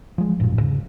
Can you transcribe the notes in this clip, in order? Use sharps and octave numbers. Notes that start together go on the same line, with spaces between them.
F3 G#3
A1 F#2 A#2
E2 G#2 C#3